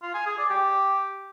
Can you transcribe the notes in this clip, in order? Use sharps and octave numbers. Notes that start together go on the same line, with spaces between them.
F4
G#5
G#4
D5
G4